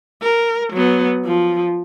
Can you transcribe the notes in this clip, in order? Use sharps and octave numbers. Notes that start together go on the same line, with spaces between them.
A#4
F#3 B3
F3